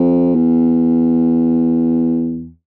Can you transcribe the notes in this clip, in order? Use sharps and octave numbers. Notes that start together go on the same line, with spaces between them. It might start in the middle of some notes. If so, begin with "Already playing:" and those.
Already playing: F2
E2